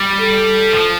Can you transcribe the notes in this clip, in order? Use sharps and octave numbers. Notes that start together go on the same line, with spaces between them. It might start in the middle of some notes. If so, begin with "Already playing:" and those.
Already playing: G3
A4
F3